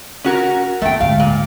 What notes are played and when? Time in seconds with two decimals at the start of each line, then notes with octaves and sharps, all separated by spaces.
0.24 C#4 F#4 A#4
0.82 F#1 D#2 A3 G5
1.01 D2 G#2 F5
1.20 A#2